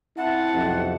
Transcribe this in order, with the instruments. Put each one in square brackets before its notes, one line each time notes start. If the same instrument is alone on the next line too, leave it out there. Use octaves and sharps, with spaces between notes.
[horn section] C4 A5 [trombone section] E4 [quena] F#5
[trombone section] B1 F2 C3